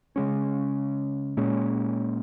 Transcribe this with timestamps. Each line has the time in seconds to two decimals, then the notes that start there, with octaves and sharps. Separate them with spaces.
0.16 C#3 G#3 C#4
1.37 A#2 G#3 C#4